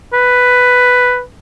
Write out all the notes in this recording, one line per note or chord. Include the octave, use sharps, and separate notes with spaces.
B4